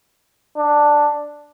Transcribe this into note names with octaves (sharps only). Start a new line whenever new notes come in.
D4